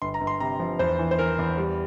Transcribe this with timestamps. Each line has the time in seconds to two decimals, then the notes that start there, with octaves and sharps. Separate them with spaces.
0.02 G1 C6
0.14 A#5
0.21 G1
0.27 C6
0.40 C3 A#5
0.60 F3
0.79 E2 C5
0.99 E3
1.11 C5
1.19 E3 A#4
1.39 E2
1.58 G3